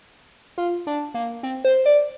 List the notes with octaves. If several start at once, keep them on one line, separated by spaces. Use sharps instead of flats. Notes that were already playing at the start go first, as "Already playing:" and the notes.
F4
D4
A#3
C4
C5
D5